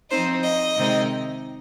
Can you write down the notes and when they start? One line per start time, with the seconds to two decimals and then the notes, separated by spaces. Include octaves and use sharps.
0.10 F3 C4 D#4 C5
0.44 D#5
0.77 C3 D#3 G#3 C4 D#4